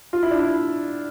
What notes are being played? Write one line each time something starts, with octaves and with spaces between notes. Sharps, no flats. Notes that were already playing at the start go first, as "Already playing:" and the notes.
F4
E4
D4
E4